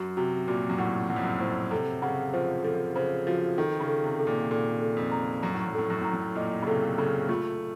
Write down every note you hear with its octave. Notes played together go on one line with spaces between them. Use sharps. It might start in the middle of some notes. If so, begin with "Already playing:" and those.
Already playing: F#2 F#4
C3 F#4
A#2 F#4
F#2
A2 F#5
F#2 F#5
F2
F#2
A2 C5
C3 A4
C#3 F#5
F3 C5
F3 A4
C#3 C5
F3 F#4
D#3 A4
C#3
A4
C3
A4
A#2
A#2 A4
A4
F2
A#5
F#2 A#5
A2
F#2
A2 A4
F#2
A2 A#5
F#2
A#2 D#5
C#3
C3 A4
C#3 A4
A3 F4